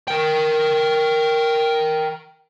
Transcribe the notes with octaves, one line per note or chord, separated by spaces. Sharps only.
A#4 G5